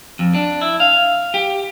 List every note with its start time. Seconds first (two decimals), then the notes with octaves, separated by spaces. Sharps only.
0.19 F2
0.35 D4
0.61 E4
0.80 F5
1.34 G4